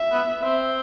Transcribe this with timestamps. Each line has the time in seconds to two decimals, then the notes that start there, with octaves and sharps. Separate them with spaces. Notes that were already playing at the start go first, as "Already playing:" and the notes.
Already playing: E5
0.12 B3
0.43 C4